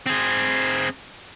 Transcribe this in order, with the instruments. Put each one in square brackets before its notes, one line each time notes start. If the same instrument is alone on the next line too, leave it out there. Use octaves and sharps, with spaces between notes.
[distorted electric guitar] C4 G#4